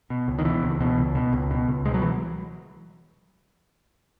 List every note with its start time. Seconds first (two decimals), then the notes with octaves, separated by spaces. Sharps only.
0.10 B2
0.28 C#2
0.39 D#3
0.45 B2 E3
0.63 C#2
0.81 B2
0.98 C#2
1.15 B2
1.33 C#2
1.51 B2
1.68 C#2
1.85 B2 G#3
1.94 F#3
2.02 E3